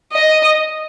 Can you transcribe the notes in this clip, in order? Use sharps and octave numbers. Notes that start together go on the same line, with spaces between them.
D#5